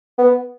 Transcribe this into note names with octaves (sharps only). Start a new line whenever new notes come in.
B3